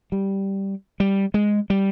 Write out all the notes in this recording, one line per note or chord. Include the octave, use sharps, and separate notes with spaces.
G3
G3
G#3
G3